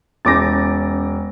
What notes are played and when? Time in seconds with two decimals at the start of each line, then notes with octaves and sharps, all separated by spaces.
0.25 E1 C#4 D6 A6 A#6